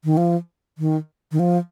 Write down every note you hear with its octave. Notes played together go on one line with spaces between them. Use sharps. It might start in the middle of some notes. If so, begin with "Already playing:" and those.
D#3
F3
D#3
D#3
F3